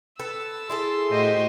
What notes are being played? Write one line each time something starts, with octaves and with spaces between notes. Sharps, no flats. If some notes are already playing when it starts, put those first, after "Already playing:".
A4 B4 A5 E6
E4 G#4 A4 C6
A2 F#4 G4 C5 D#5